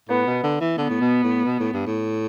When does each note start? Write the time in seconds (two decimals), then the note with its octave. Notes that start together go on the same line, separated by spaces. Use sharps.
0.09 A2 B3
0.27 B2
0.43 D3
0.60 E3
0.77 D3 B3
0.89 A2
1.01 B2
1.23 A2
1.45 B2
1.60 A2
1.73 G2
1.86 A2